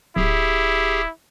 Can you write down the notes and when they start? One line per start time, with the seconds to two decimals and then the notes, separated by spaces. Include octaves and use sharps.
0.16 D1 E4 G4 G#4